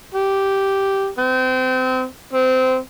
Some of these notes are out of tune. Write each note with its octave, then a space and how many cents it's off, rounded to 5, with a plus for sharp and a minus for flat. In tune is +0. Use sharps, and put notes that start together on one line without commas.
G4 -5
C4 -30
C4 -20